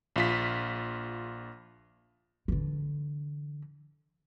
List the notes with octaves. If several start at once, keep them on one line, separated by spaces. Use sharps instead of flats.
A#1 F4 B6
D3 E3